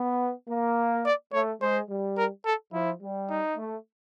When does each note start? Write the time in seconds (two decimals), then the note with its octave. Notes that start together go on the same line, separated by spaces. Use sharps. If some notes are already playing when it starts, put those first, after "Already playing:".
Already playing: B3
0.49 A#3
1.05 D5
1.33 A3 C#5
1.61 G#3 C5
1.90 G3
2.17 A#4
2.46 A4
2.73 F3 E4
3.02 G3
3.30 D#4
3.57 A3